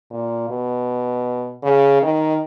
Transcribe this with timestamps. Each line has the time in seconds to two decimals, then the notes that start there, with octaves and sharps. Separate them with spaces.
0.11 A#2
0.49 B2
1.63 C#3
2.02 D#3